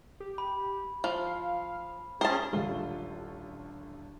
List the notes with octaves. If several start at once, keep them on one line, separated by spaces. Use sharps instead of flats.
G4
B5
F3 F5
C#4 G#4 C5 G5 A5
D#1 A1 D3 A3 F4 G7